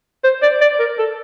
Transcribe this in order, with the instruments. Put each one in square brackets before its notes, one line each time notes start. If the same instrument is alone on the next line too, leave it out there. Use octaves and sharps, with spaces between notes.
[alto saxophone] C5
D5
D5
A#4
A4